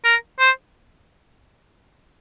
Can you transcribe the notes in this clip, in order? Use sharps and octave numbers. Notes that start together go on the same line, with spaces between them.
A#4
C5